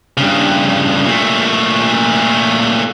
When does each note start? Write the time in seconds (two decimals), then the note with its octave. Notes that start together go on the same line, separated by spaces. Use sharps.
0.17 G2 C#3
1.06 A#2 A3